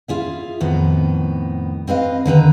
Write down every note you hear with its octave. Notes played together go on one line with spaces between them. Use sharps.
F4 G#4 E5
F2 A2 D#3 B3
C4 B4 D#5 F5
D3 D#3 B4 A#5